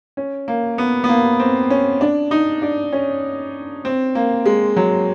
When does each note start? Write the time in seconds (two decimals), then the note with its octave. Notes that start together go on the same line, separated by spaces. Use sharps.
0.17 C#4
0.48 A#3
0.78 B3
1.04 B3
1.09 A#3
1.40 C4
1.70 C#4
2.01 D4
2.31 D#4
2.62 D4
2.93 C#4
3.85 C4
4.15 A#3
4.46 G#3
4.76 F#3